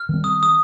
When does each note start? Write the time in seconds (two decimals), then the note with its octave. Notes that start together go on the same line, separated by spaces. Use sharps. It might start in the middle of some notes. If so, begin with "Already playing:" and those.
Already playing: F6
0.09 D#3 G3 C4
0.24 D#6
0.43 D#6